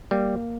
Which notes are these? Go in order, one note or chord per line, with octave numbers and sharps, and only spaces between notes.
G3 A#3